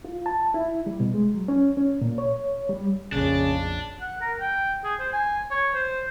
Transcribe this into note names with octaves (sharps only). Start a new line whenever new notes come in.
F4
A5
E4
G3
B2
G#3
F#3
C#4
C#4
A#2
C#5
G3
A#1 F2 C#3 D4
F#5
A#4
G5
G#4
C5
G#5
C#5
C5